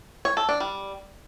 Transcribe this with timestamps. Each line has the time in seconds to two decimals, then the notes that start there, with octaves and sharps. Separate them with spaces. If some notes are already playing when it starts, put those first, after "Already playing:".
0.25 C#5
0.37 A4
0.49 D4
0.60 G3